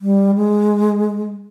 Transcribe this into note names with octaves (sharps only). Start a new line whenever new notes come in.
G3
G#3